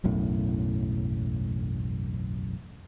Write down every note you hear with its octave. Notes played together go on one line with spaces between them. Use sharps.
E1 B1 F#2 A2